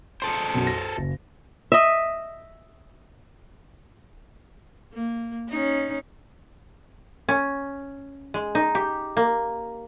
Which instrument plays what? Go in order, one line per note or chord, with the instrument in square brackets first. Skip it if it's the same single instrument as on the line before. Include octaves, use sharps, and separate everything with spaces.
[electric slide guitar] G#4 A4 C5 [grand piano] C6
[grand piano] B1 F#2
A#6
F#1
[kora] D#5 E5
[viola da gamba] A#3
C#4 D#4
[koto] C#4
G#3
D#4
G4
A#3